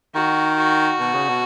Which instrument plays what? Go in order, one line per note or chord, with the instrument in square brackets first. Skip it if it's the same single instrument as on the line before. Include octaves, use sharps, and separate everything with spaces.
[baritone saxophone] D#3 [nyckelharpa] F#4
[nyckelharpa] F#4
[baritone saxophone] B2
C#3
B2